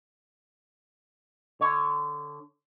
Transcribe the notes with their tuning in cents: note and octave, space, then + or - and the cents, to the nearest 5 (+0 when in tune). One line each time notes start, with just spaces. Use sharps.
D3 +0 C#5 +0